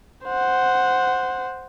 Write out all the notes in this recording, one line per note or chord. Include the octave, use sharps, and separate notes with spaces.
C5 F#5